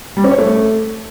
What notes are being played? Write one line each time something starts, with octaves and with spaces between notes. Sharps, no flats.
G3
C#4
C#5
A3